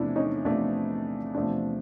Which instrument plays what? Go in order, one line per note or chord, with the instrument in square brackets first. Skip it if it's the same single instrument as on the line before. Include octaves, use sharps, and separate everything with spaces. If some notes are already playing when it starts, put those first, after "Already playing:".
Already playing: [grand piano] E2 C3 F3 A3 [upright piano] D4 E4
[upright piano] C#4 D#4
[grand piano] E2 C3 F3 A3 [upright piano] D4
[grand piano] E2 C3 F3 A3 [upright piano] D4